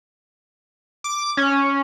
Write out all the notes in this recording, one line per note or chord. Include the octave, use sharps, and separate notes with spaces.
D6
C#4